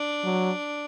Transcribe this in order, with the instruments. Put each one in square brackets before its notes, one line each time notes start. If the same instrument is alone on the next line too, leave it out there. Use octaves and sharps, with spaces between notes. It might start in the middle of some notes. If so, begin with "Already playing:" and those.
Already playing: [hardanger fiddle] D4
[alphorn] F#3